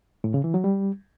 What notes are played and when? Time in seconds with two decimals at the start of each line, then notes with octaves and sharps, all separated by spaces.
0.24 A2
0.34 C#3
0.44 E3
0.54 F#3
0.64 G3